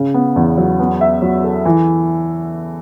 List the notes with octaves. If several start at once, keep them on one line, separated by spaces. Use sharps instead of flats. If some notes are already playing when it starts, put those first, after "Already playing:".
Already playing: C#3
B3
E2
F#3
B3
E5
F#3
A4
E3